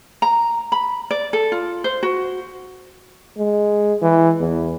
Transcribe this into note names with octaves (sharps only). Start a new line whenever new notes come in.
A#5
B5
D5
A4
F4
C5
F#4
G#3
E3
E2